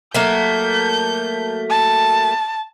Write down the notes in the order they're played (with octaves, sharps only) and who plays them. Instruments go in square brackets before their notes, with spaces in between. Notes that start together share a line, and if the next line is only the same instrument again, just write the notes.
[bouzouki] F#3 A3 A#3 [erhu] G6
[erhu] A5